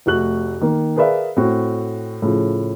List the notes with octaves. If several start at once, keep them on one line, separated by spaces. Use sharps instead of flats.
F1 A3 F#4 F#6 F#7
D#3 A#3
G#4 A#4 B4 D5 E5 F5
A2 C4 F#4
A2 C#3 F3